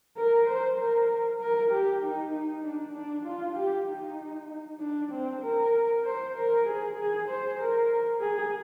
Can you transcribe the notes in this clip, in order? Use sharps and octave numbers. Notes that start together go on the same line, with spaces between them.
A#4
C5
A#4
A#4
G4
D#4
D#4
D4
D4
F4
G4
D#4
D4
C4
A#4
C5
A#4
G#4
G#4
C5
A#4
G#4